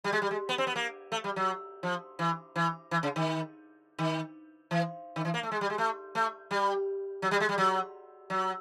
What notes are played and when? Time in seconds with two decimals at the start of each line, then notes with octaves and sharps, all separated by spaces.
0.04 G3
0.12 G#3
0.22 G3
0.31 G#3
0.49 B3
0.58 C4
0.67 B3
0.76 A#3
1.12 A3
1.24 G3
1.36 F#3
1.83 F3
2.19 E3
2.56 E3
2.91 E3
3.03 C#3
3.16 D#3
3.99 D#3
4.71 E3
5.16 D#3
5.25 E3
5.34 A#3
5.43 A3
5.52 G#3
5.61 G3
5.70 G#3
5.78 A3
6.15 A3
6.51 G3
7.22 F#3
7.31 G3
7.40 G#3
7.49 G3
7.58 F#3
8.30 F#3